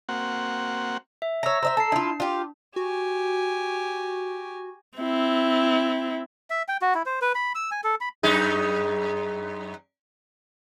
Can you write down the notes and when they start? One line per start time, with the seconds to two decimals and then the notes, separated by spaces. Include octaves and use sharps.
0.09 A#3 C4 F#4 F#5
1.22 E5
1.43 C#5 A#5 E6 A#6
1.63 C5 D#5 E5 A#5 E6
1.77 A4 A5 C7
1.92 D4 E4 F4
2.20 F4 G4
2.76 F#4 G4 G#5
4.98 C4 E4
6.50 E5
6.68 G5
6.82 F#4
6.95 E4
7.06 C5
7.22 B4
7.35 B5
7.55 E6
7.71 G#5
7.84 A4
8.01 B5
8.23 F#2 D#4 G#4